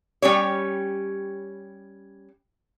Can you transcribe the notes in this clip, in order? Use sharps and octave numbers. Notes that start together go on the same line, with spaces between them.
G3 C#4 G4 C#5